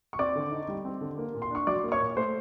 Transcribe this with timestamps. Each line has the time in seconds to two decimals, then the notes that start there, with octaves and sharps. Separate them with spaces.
0.13 C#6
0.19 C4 D5 D6
0.36 D3
0.52 D#4
0.68 G3
0.85 C4
1.01 D3
1.18 A#3
1.34 A#2
1.42 C6
1.51 D4 C#6
1.67 F#3 D5 D6
1.84 A#3
1.92 C#5 C#6
2.00 A#2
2.17 A3 C5 C6